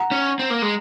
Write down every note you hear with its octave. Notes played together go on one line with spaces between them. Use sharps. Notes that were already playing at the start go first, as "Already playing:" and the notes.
Already playing: F#5 A#5
C#4
C4
A#3
G#3